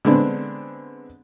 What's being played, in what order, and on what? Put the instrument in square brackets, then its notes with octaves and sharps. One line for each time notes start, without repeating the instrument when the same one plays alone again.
[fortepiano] D3 G#3 B3 C4 D4